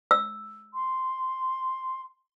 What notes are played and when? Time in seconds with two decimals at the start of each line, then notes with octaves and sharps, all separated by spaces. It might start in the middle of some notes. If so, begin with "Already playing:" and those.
0.11 E6
0.74 C6